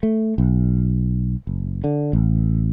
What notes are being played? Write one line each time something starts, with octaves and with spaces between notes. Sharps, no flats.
A3
B1
F#1
D3
A1